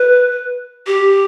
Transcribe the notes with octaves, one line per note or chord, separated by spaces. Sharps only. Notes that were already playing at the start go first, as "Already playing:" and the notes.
Already playing: B4
G4